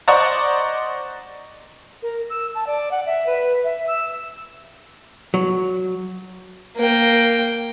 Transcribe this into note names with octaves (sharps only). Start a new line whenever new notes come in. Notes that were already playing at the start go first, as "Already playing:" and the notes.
C5 D5 D#5 F#5 A#5 C#6
A#4
E6
A5
D5
F#5
E5
B4
E5
E6
F#3
A#3 G5